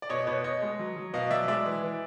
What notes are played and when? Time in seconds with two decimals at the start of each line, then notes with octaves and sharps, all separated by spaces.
0.02 D5
0.09 B2 C#5 D#5
0.27 B2 B4 C#5
0.44 B2 C#5 D#5
0.62 G#3
0.79 F#3
0.97 F#3
1.14 B2 D#5 F5
1.31 F#3 D5 E5
1.48 G#3 D5 E5
1.66 E3
1.83 E3